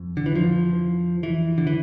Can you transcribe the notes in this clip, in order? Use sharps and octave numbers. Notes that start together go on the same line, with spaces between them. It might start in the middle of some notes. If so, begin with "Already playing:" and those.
Already playing: F2
D3
E3
F3
E3
D3
E3